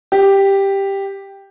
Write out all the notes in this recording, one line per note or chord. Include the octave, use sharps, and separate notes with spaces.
G4